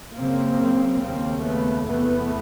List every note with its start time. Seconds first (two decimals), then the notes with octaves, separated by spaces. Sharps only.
0.16 F#2 C#3 A#3 C4
1.01 D#2 C#3 A#3 C4
1.44 A3 B3
1.86 E2 C3 A3 B3